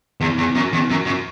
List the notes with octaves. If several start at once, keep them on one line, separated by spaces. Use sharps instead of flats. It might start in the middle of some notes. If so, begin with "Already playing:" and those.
E2
E2
F#2
E2
F#2
F#2